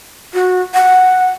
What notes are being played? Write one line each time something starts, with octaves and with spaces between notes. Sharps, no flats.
F#4
F#5